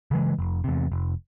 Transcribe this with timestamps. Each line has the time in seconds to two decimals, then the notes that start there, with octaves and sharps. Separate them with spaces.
0.11 C#3 E3 G#3
0.39 F1
0.64 E2 C3
0.92 F1